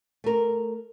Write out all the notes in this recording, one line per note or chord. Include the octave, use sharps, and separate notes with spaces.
A3 A#4